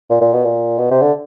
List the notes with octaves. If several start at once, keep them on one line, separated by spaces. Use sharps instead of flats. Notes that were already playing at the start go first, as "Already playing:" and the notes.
A#2
A#2
B2
A#2
B2
C3
D3